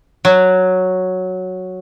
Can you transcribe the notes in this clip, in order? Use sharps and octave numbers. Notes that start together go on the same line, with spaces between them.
F#3